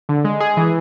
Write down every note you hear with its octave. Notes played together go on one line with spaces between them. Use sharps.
D3
G#3
G#4
E3